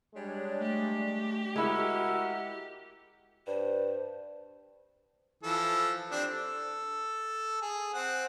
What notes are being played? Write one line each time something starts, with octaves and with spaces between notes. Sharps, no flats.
G3 G#3 D4 C#5
A3 G4
G#3 E4 F#4 A#4 E6
G2 C5
E3 F3 A4
C4 D4 G4
A4
G#4
C4 F#5